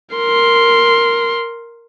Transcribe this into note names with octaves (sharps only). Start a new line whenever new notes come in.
A#4 C6